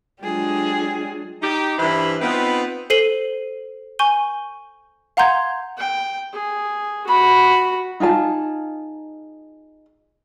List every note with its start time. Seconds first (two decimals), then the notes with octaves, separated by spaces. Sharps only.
0.22 F#3 G#3 D4 F4 G4 G#4
1.42 D#4 G4
1.78 G2 E3 E4 C5 B5
2.21 B3 C4 D#4 F4 B4
2.90 A4 C5 C7 D#7 F#7 G7
3.99 G#5 C#6 G6 D#7 G7
5.17 F5 F#5 A#5 C6 G6 G#6
5.77 G5
6.33 G#4
7.07 F#4 B5
8.00 D#4 F4 G#4 A5